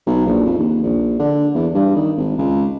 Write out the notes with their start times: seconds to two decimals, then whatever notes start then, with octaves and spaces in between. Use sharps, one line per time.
0.07 B1
0.26 A#1
0.46 F2
0.58 D#2
0.82 A#1
1.19 D3
1.55 E2
1.74 G2
1.96 D#3
2.17 G#1
2.38 C#2